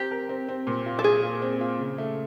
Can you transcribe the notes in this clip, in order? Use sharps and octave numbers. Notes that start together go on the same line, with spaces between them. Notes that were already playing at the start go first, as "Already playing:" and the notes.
Already playing: C4 G4 A#4
A#4
C4
C4
A#2
F4
A4
F4 G#4
F4
C4
F4
C#3
A3